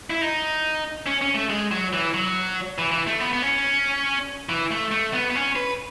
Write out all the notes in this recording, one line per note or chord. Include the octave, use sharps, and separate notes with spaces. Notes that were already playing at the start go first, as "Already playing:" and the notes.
E4
D#4
C#4
C#4
A3
G#3
F#3
E3
F#3
E3
E3
A3
B3
B3
C#4
E3
A3
A3
B3
B3
C#4
B4